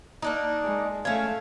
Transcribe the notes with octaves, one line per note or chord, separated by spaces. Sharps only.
A#3 D4 D#4
G#3
A3 C#4 C#5 F5